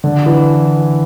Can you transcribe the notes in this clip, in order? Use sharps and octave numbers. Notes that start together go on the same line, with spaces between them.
D3
E3